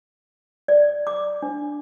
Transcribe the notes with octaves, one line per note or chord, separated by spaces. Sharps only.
D5
D6
D4